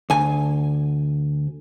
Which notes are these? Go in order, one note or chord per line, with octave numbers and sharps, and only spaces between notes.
D2 G#5